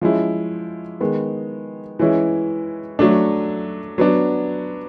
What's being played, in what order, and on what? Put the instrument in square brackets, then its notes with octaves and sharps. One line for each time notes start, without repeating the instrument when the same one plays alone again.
[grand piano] F3 G#3 C#4 E4
D#3 G#3 B3
E3 G#3 C#4 E4
F#3 A3 D4
F#3 B3 D4